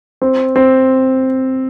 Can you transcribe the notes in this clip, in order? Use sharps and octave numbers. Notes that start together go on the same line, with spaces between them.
C4
C4